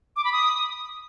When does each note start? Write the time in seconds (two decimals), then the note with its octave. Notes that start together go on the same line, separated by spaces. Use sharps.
0.16 D6
0.24 B5
0.33 D#6